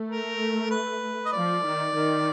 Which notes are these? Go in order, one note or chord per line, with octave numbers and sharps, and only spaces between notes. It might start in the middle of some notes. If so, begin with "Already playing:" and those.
Already playing: A3
A#4
B4
D#5
F3 D5
D#3
D#3